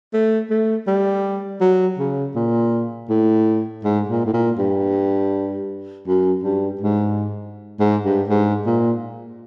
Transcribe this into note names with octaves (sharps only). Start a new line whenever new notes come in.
A3
A3
G3
F#3
C#3
A#2
A2
G#2
A#2
A2
A#2
G2
F#2
G2
G#2
G#2
G2
G#2
A#2